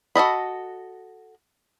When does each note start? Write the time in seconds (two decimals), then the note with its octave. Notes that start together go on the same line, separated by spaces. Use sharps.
0.16 F#4 A4 D#5 B5